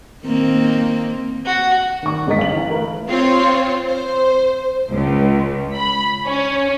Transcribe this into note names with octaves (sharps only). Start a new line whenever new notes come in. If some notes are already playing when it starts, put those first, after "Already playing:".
D#3 A#3 C4
F#4
D#3 C#6
G1 G#3 A#4 D#5 B6
F5 F#7
E3 F5
A3 A#4 B4
C4 F4 C#5
C5
C#2
B5
C#4